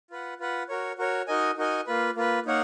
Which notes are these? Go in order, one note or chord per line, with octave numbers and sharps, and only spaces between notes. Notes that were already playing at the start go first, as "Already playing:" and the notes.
F4 B4 F#5
F4 B4 F#5
F#4 A#4 C#5
F#4 A#4 C#5
D#4 F#4 A#4 D#5 G#5
D#4 F#4 A#4 D#5 G#5
A#3 F4 B4
A#3 F4 B4
A#3 D#4 A#4 C#5 F#5